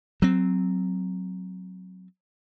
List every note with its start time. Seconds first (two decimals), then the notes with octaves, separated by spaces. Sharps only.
0.22 F#3 C4